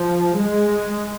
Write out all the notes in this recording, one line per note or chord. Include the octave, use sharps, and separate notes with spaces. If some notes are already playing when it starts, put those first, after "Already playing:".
Already playing: F3
G#3